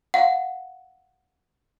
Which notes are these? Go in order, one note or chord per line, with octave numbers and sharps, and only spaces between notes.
F5 F#5